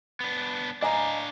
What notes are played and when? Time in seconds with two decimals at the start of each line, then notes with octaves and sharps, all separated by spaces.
0.20 B3 D4
0.82 D4 D#5 F5 G#5 A#5